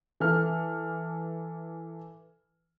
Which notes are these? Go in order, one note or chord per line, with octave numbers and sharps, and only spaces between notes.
E3 A4 F6